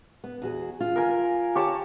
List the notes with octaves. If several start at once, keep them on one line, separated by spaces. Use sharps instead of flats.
B3
E2 F#4 G#4
F4
A#4 G#5
G4 C#5 A5